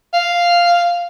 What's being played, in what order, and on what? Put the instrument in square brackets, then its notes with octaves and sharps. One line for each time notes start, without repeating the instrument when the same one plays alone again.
[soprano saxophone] F5